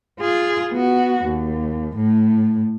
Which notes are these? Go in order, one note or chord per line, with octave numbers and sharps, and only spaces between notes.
F4 G#4
B3 F#4
D#2
A2